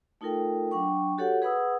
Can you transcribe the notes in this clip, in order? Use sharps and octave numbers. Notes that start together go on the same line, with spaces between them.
A3 D#4 F4 A4 A#4 G5
F#3 D4 G5 C#6
F#4 G4 A4 C#5 F#5
G#4 B4 F#5 B5 D#6 E6